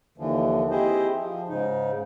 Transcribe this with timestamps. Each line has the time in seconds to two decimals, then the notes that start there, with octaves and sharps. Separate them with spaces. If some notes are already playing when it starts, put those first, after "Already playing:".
0.18 D#2 D3 E3 F3
0.71 C4 E4 G4 G#4 C5 D#5
1.18 F3
1.48 G#2 C#3 D#4